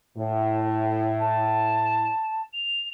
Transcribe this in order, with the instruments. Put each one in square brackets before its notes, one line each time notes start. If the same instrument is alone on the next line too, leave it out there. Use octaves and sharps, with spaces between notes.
[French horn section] A2
[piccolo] A5
F7